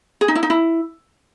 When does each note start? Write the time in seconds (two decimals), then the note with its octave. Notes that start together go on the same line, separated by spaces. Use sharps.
0.21 G#4
0.28 D#4
0.35 E4
0.43 D#4
0.50 E4